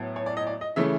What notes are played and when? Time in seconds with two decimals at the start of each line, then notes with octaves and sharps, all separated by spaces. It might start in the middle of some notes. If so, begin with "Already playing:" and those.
Already playing: A2 F#3 B3
0.16 C#5
0.26 D5
0.37 D#5
0.47 D5
0.61 D#5
0.76 C#3 E3 A3 E5